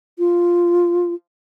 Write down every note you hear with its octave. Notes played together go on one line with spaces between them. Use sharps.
F4